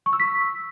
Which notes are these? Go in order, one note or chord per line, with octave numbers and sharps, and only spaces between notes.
C#6
E6
B6